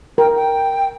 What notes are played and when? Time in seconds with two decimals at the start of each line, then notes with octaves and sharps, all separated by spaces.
0.18 A#4 G5
0.36 G5